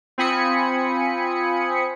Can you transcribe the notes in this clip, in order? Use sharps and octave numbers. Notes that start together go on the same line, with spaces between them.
C4 F4 G#5 B5 D#6 C#7